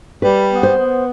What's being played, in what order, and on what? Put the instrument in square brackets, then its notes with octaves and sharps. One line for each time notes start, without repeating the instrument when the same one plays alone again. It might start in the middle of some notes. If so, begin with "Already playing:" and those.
[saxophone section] G3 [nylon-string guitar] B4
[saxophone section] B3
[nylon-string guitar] C5
[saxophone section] B3